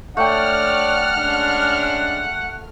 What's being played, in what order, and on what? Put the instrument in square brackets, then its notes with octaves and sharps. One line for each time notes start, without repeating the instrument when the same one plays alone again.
[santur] A3 G5 [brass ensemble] D4 C#5 D5 [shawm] F#5 [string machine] F6
[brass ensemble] G#3 C#4 D4